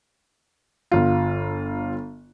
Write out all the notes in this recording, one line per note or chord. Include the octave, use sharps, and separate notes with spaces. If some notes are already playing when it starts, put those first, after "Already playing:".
G1 F4